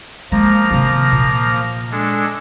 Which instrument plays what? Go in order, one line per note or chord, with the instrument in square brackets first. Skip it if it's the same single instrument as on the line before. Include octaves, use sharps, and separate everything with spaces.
[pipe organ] F3 A#3 A#5 [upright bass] G#3
[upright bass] C3 D#3
A#2
[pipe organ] G#3 D4 A4